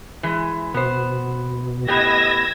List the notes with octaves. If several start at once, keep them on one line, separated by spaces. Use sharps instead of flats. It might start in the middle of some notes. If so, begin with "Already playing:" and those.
E3 G#3
B2 B3 C5
A2 B3 G4 D#5 E6 G#6 A#6